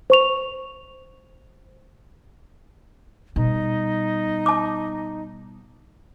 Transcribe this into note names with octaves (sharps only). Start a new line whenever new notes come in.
C5 C#6 F7
B2 G3 D#4
A5 D6